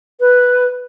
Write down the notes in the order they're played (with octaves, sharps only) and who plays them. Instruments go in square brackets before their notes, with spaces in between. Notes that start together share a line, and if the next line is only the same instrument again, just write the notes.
[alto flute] B4